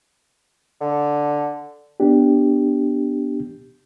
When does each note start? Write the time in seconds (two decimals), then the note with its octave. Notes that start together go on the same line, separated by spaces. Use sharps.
0.81 D3
2.00 B3 D4 G4